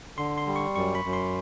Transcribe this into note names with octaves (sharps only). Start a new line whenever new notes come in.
D3 C6
C6
G3
C#6
F#2 C#6
B5
F#2
C6